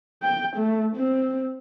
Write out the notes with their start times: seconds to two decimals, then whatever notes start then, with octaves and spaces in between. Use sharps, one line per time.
0.23 G5
0.56 A3
0.96 C4